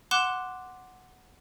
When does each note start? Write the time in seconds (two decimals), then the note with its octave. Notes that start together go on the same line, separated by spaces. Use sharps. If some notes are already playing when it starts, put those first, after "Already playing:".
0.11 F#5 C6 D6 F#6 E7